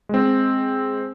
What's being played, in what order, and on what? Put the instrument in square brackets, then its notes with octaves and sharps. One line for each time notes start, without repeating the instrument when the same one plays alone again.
[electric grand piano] G#3 C4